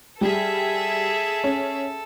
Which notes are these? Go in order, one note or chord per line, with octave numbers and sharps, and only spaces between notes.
G3 G#4 A4 E5
C#4